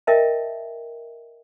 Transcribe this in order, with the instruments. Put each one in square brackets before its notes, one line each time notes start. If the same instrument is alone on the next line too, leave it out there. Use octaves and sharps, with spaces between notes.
[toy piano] A#4 D#5 E5 G5 A5